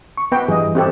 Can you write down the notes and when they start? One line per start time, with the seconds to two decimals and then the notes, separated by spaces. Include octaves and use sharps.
0.17 C#6
0.32 B3 B4 G5
0.48 G2 E3 G3 G#4 D#5
0.75 C4 G4 A4